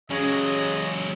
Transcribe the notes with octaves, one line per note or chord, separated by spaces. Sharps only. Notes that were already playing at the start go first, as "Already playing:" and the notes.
C#3 F#3 G#3 C#4 D#5